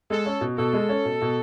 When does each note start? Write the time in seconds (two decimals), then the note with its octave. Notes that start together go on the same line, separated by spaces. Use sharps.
0.10 G#3 A4
0.26 C#4
0.41 B2
0.57 B2 A4
0.73 G#3
0.89 C#4
1.05 B2
1.22 B2